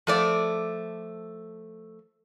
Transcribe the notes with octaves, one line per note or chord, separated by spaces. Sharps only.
F3 A3 D5